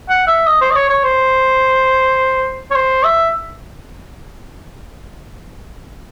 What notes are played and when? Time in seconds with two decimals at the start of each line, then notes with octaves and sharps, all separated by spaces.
0.09 F#5
0.27 E5
0.47 D#5
0.62 C5
0.71 D#5
0.75 C#5
0.89 C#5
1.04 C5
2.71 C#5
2.75 C5
3.04 E5